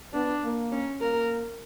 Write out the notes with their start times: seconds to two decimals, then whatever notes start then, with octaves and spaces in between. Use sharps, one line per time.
0.13 B3 D4
0.43 A#3
0.72 C#4
1.01 A#3 A#4